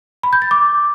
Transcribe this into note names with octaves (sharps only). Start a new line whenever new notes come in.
B5
G6
A6
D6